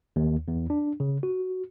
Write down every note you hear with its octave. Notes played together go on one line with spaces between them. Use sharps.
D#2
E2
D4
C#3
F#4